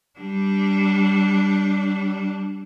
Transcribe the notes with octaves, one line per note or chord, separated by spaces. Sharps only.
G3 D4